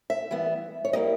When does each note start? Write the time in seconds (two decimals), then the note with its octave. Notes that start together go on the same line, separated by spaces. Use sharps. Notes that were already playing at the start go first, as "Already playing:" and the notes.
0.10 E5
0.31 E3 G3 B3
0.85 C#5
0.93 G3 A#3 E4 D#5